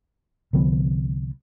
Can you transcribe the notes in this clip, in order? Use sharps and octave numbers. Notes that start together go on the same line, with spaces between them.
C2 D3 F3 B3